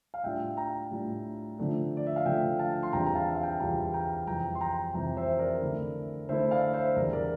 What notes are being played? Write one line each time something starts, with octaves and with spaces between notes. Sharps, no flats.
F5
A2 G3 D4 F4 E5 G5
G5 A#5
A2 G3 D4 F4
D3 F3 A3 D4
D5
E5
F5
D3 F3 A3 D4 E5 G5
F5 A5
C6
E2 C3 G3 D4 F4 G5 A#5
A#5
F5 A5
E5
F5
G5
A5
E2 C3 G3 D4 F4 G5 A#5
G5 A#5
F2 C3 E3 G3 G5 A#5
C6
G5 A#5
F2 C3 E3 G3 G5 A#5
C5 E5
A#4 D5
D3 A3 E4
D3 A3 E4 C5 E5
D5 F5
C5 E5
E2 D3 G3 A#4 D5
A#4 D5